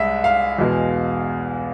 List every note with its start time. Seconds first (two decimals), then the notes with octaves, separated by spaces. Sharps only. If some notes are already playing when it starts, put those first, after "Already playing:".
Already playing: C2 G#3 E5
0.24 F5
0.58 E2 B2 G#3